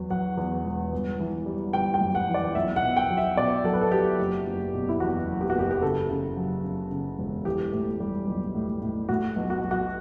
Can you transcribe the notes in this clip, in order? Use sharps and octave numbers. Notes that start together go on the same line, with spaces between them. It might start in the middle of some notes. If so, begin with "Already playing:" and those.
Already playing: E2 F#3
F#3 F#5
E2
E1
G1
E3
G3
G1 G5
G5
F#2
F#5
E3
D5
B1 E5
F#5
B2
G5
F#3
E5
B2 D5
F#3 A4
B4
A4
F#3 G4
F#1
F#1
B2
E4
E2 F#4
F#1
G4
F#4
F#1 G4
G4
C#3 A4
C#3
F#3
C#3
C#3
E1
E3 G4
A2
G3
B1
A2
A2
A2 F#4
B1
F#4
B1
F#4